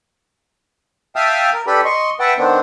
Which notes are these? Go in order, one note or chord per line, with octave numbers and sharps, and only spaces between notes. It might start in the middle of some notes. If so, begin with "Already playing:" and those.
E5 F5 G5 A5 D#6 F6
A#4
D4 G4 A4 B4 B5
D#5 C6 C#6
B4 E5 F#5 G5 A5
D#3 B3 C4 D4